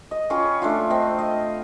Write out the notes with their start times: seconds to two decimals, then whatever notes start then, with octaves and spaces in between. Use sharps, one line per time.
0.11 D#5
0.30 C#4 F4 G5 B5
0.62 A3 D4 F4
0.90 C4 D#5 G5
1.18 D#5